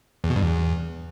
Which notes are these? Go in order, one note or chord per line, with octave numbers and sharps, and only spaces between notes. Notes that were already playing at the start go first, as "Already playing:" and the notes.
E2
B2
G2
E2